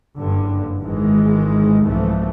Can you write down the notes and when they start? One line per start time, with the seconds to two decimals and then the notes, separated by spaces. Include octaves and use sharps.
0.17 F#1 G2 D3
0.81 G#1 G#2 D#3 E3 G#3
1.83 C2 G#2 E3 F3 A3